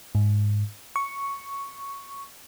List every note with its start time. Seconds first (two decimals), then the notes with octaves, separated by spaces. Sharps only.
0.15 G#2
0.96 C#6